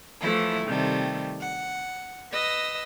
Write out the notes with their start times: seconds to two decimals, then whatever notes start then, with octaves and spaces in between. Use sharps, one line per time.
0.21 E3 F3 A3 E4
0.66 C3 D#3 G3 A3
1.41 F#5
2.31 B4 D#5 E6 A#6